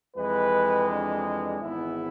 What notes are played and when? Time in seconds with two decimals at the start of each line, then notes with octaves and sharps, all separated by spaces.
0.15 F2 E3 G#3 B4
0.88 D4
1.24 D4
1.60 G#1 G#2 E3 B3 E4